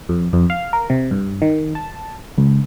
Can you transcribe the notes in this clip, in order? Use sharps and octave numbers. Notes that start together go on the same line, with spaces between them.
F2
F2
F5
A#4
C3
G2
D#3
A5
C#2